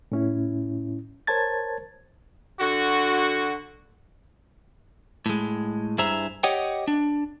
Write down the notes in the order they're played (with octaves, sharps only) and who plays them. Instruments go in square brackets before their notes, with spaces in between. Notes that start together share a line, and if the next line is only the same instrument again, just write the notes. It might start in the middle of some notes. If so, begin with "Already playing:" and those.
[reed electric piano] A2 C#4 E4
A#4 C5 C#5 A5 G#6 A6
[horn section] D3 F#4
[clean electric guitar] A2 G#3
G2 E4 G#4 C5 E5 A#5
G4 C#5 D#5 F#5 G5
D4